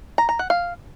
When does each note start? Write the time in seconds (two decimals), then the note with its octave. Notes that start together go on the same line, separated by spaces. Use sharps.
0.18 A#5
0.29 A#5
0.39 F#5
0.50 F5